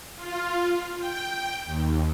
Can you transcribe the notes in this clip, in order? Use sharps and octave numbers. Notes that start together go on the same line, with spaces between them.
F4
G5
D#2